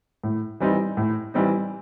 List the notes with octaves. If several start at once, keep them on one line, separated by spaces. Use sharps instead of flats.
A2
E3 G3 C4 D#4
A2
E3 G3 C4 D#4